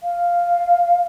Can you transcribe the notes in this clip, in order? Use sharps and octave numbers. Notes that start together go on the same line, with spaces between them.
F5